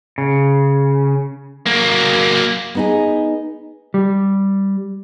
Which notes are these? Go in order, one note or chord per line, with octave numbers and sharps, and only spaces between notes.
C#3
F#3 A#3
B3 D#4 G#4
G3